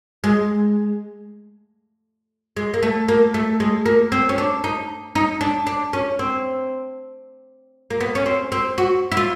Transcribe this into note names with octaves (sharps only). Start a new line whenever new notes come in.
G#3
G#3
A#3
A3
A#3
A3
G#3
A#3
C4
C#4
D4
D#4
D#4
D4
D4
C#4
C4
A#3
B3
C#4
C4
C4
F#4
E4
F4